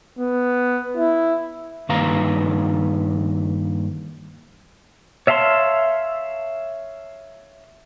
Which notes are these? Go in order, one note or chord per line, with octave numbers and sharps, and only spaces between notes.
B3
E4
G2 D#3 A#3 B4 F5 A#5
C#5 E5 F5 A5 C6